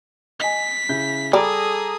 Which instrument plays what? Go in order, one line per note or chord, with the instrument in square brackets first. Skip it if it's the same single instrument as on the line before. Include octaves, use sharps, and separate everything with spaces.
[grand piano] D#5 G#5 [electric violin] B6
[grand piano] C#3 E4 G6
[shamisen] G3 D5 [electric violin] G#4 [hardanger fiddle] A4 D#6 [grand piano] A#5 B5 D6